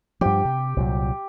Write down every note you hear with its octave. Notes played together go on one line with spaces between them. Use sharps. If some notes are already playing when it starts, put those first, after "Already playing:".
G2 F3 G4
C3
C2 A#2 F#3